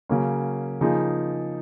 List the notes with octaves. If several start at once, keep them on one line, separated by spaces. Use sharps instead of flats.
C#3 F#3 A#3 C#4
C#3 F3 A#3 D#4 G#4